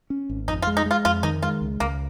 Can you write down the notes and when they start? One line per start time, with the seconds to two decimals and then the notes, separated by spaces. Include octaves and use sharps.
0.10 C#4
0.29 G#1
0.48 F2 D#4
0.62 F4
0.67 G#3
0.77 D#4
0.86 G#3 F4
1.05 F2 F4
1.23 D#3 D#4
1.42 G#3 F4
1.61 C#2
1.80 C#2 A#3